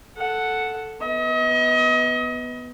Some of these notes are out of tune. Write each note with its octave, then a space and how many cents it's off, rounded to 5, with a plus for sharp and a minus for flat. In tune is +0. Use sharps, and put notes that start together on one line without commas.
A4 +0 F#5 +0
B3 +0 D#5 +35